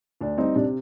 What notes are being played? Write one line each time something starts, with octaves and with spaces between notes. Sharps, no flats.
D2 D4
G3 C4 D#4
C3 D4